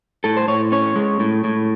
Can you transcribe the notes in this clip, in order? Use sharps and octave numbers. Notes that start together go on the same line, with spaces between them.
A2 A4
C5
A2 C#5
C#4 C#5
G#3
A2
A2